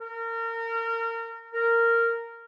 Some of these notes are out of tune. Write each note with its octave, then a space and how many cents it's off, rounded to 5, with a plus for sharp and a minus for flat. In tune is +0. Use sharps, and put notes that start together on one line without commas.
A#4 -30
A#4 -10